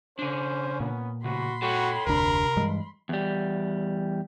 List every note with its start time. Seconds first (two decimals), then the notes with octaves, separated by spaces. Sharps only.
0.19 C#3 C#4 D4 C5
0.80 A#2 B3
1.24 A2 C#3 F#4 B5 C6
1.62 F#4 A4 C#5 G5
2.07 F1 D2 C3 D4 A#4
2.57 G2 E3 G#3
3.09 E2 G3